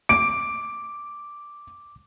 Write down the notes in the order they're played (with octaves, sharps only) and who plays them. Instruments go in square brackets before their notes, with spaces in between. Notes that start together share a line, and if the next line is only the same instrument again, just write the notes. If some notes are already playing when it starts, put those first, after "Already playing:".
[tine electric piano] D6 [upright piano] D7